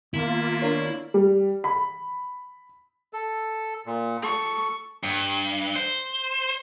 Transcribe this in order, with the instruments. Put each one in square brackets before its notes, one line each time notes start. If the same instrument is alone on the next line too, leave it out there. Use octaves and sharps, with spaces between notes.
[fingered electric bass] D#3 B3 [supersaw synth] A#3 F4 [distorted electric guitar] E4
[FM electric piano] D4 A#4 C#5
[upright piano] G3
B5
[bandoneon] A4
A#2
[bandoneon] A4 [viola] C#6
[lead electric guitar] G2
C5